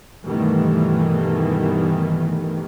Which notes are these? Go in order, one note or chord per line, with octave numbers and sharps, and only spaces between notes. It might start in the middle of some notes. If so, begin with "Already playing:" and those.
G2 B2 D#3 E3 A3